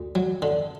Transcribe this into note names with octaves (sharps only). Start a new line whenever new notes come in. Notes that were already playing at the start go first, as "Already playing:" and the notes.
Already playing: D2
F#3
D3